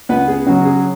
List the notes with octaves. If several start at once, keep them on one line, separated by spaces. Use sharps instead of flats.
C#2 B3 B4
G#4
C#3 F#3 F#4
G#4